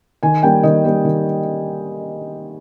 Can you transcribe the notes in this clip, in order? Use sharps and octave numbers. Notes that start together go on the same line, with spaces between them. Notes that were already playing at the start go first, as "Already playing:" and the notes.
D#3 G#5
G3 A#3 G5
D#3 D#5
G3 A#3
D#3